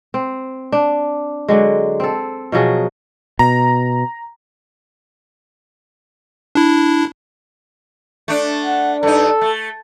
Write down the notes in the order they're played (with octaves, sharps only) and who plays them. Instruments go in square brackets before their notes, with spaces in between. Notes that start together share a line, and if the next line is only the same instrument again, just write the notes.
[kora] C4
D4
D3 F#3 G#3
C4 A4
B2 F3 F#3 G#4
[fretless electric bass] B2 [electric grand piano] A#5
[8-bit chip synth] D4 E4
[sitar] A3 D4
[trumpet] F#5
[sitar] G2 D#4 [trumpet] A4
[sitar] A3